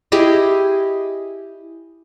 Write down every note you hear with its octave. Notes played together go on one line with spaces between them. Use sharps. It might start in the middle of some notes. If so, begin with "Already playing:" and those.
E4 G4 G#4 D#5